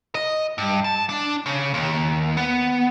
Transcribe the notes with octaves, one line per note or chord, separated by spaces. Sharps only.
D#5
G2
A5
D4
C#3
D#2
B3